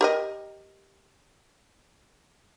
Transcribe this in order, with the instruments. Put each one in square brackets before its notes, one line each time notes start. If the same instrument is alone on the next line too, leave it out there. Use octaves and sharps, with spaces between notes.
[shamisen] G4 A#4 D#5